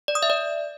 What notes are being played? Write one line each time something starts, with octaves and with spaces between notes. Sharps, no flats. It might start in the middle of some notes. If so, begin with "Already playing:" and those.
D5
D#6
E5
D5